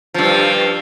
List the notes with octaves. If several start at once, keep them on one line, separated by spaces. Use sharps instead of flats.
G2 F3